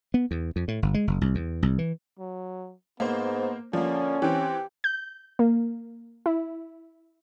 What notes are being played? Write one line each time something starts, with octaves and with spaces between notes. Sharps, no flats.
B3
E2
F2
A2
G1
G#3
F#1
C2
E2
C2
E3
F#3
G#2 A#3 B3 C5
D3 F3 A#3 C#4
E3 C4 G4
G6
A#3
E4